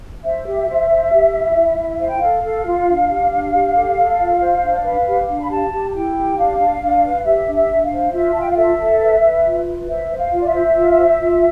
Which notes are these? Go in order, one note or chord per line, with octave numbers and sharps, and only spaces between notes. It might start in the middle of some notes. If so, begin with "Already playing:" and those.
C5 E5
G4
C5
C5
G4
E4
E4
E4
C5 F5
G5
A4 F5
A4
F4
D4
G4
D4
G4
A4
A4
F4
C5
D4
B4
G4
D4
B5
G4 A5
G4
A5
E4 G5
G4
D4 F5
D4
D4
B4
G4 E5
D4
E5
D4
F5
C5
F4 E5
F4 A5
G5
F5
A4 E5
A4
B4
B4
F4
B4
C5 E5
C5
F5
F4
D5
E5
C5
F4
C5
F4